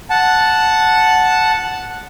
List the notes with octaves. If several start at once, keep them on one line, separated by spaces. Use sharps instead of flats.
F#5 A5